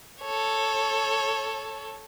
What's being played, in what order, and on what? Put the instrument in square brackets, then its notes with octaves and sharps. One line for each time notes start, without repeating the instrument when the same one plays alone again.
[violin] A4 C#5